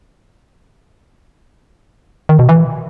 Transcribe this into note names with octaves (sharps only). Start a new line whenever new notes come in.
D#3
B2
E3